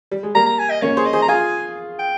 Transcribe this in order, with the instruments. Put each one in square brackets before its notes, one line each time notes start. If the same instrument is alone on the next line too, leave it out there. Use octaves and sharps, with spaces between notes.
[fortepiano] G3
G#3
[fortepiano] G3 A#3 [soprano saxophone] A#5
[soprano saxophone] A#5
G#5
D#5
[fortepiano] A#3 C#4 [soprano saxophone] C#5
[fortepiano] G#4 C5
[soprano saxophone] D#5
[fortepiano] G#4 C5
[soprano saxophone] A#5
[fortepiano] F4 G#4 [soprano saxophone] G#5
[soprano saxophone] G5